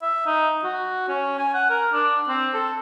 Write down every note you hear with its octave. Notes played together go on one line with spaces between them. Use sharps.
E5
D#4
F#4
C#4
G#5
F#5
A#4
D4
C4
A4